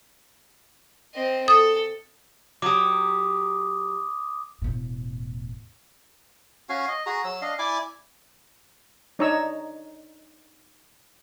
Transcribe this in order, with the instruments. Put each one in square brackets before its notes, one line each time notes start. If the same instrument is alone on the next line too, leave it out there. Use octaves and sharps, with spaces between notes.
[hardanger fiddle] C4 D#5
[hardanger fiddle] A4 [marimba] D#6
[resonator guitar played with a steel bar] F#3 G4 [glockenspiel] D6 D#6
[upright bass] E1 A2
[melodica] C#4 F#4 F5 G#5
D#5
F#4 G#4 A#5
F#3 E6
D4 D#5 F5
E4 D5 G#5 D6
[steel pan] D4 D#4 C#5 D#5 A#5 E6